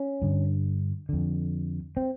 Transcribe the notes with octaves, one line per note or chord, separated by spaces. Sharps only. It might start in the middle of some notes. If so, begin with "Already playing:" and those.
Already playing: C#4
G2 D3
F2 D3
C4